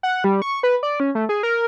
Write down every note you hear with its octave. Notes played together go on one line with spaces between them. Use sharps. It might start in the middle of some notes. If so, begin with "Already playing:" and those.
F#5
G3
C#6
B4
D5
C#4
A3
G#4
A#4